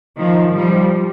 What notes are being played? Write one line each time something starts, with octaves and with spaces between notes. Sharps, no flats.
D#3 F3
F3 G3